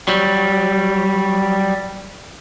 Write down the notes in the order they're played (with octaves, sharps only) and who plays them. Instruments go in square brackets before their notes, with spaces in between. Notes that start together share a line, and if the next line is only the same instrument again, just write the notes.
[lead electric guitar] F#3 G3